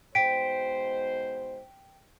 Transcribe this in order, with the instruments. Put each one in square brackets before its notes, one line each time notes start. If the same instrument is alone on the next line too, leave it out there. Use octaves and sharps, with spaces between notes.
[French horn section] G#2 B2 C5 [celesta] G5 B6 D7